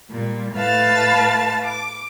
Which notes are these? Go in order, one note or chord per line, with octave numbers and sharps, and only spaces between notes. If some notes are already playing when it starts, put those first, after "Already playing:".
A#2 G3
A2 A3 B4 F5 A5 A6
D6